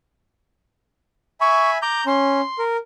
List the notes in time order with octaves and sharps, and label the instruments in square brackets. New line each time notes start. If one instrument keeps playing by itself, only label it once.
[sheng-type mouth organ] E5 G#5 B5 [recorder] C#6
[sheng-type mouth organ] A#5 G6 [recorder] D6
[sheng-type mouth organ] C#4 [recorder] C6
[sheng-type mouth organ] A#4